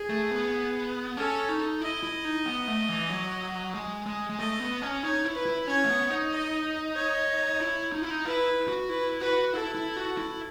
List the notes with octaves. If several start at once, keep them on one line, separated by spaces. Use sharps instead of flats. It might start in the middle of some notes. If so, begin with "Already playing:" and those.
Already playing: G#4
A3
B3
C#4 A4
D#4
E4 D#5
E4
D#4
B3
A3
E3
F#3
G#3
G#3
G#3
A3 D#5
B3
C#4
D#4 C#5
E4
B4
E4
C#4 C#5
A3
B3
D#4
D#5
C#5
E4
D#4
E4
D#4
E4 B4
F#4
E4 B4
F#4 B4
E4 A4
E4
F#4
E4